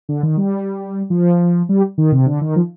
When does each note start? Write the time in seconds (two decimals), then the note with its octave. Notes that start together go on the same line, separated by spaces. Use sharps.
0.09 D3
0.23 D#3
0.37 G3
1.10 F3
1.69 G3
1.98 D#3
2.12 C3
2.26 D3
2.41 D#3
2.56 F3